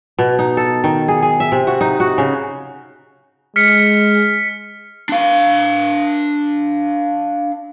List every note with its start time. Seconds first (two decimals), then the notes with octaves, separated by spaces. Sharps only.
0.19 B2
0.39 D#4
0.57 A4
0.84 D#3
1.08 G#4
1.23 G#4
1.40 E5
1.52 C3
1.67 F#4
1.81 D#4
2.00 F#4
2.18 C#3
3.56 G#3 F6 B6 C#7
5.09 D4 F5